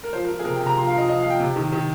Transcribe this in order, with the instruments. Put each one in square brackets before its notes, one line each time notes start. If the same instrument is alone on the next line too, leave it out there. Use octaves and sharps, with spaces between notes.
[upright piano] A#4
F3 C5
A#4
F3
G#4
C3 A#4
G5
C3
A#5
F3 C6
F5
F3 D#5
F3 D#5
F5
F3
G5
C3
D#3
D#3